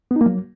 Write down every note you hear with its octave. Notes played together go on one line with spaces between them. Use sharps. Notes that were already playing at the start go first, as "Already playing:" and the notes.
B3
D#4
A#3
F#3